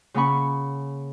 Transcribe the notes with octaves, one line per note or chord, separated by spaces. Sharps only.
C#3 A#3 C#4 F#5 B5 C#6